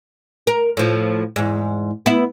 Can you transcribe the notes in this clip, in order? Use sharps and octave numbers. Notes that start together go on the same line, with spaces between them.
A#4
A2 F3
E2 G#2
B3 E4